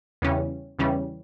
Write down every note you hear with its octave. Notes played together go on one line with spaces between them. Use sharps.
E2 C#3 E3 G3 C#4
E2 C#3 E3 G3 C#4